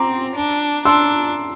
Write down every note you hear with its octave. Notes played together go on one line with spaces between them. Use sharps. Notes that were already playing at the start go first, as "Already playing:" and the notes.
Already playing: C4 A#5 C6 D6
D4
D4 C6 E6